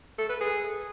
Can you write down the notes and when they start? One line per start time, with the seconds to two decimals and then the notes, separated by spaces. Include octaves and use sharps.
0.18 A4
0.29 B4
0.40 G#4